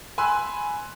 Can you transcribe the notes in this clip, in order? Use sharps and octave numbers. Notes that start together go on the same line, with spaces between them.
G#5 B5 C6 E6 F#6